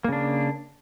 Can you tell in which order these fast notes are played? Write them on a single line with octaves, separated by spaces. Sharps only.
A#3 C#3 D4